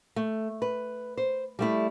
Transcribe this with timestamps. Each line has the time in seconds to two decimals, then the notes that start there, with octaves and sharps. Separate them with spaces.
0.16 A3
0.62 B4
1.17 C5
1.59 G3 A3 E4